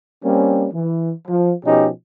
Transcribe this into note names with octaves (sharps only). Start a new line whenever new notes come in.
G3 A#3 C4 C#4
E3
F3
B2 F3 C#4 D#4 G4